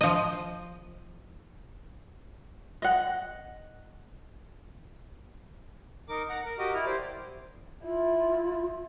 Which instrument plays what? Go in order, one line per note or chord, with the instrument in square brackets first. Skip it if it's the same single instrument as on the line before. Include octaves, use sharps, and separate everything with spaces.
[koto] F3 D#5
[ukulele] D#5 F#5
[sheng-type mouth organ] D#4 A#4 D6
F#5 A#5
A#4
F#4 G4 A#4 D#5
E4 F6
G4 C5 D5
[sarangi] E4 [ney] F4